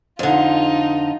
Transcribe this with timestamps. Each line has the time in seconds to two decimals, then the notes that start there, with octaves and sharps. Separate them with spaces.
0.19 F2 D3 D#4 F4